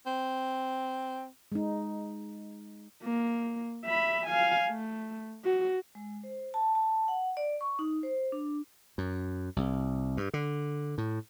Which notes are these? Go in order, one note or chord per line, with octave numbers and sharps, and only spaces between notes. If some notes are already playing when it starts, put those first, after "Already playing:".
C4
G#3 D#4
A#3
E5 B5
F5 G#5
A3
F#4
G#3
C5
A5
A5
F#5
D5
C#6
D#4
C5
D4
F#2
C2
G2
D3
A2